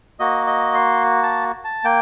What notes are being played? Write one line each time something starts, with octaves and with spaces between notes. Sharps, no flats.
A#3 F#4 D#5
D#5
C6
A5
A5
A#3 G5